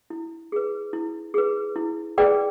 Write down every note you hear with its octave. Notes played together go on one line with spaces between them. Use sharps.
E4
G#4 B4
E4
G#4 B4
E4
G#4 B4 D5 G5